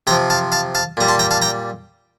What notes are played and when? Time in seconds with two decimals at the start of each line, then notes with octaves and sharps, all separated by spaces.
0.07 C3 G5 A#5
0.11 F3
0.30 F5 A5
0.52 F5 A5
0.75 F5 A5
0.97 A#2 G3 A#5
1.08 A5 C6
1.19 G5 A#5
1.31 F5 A5
1.42 G5 A#5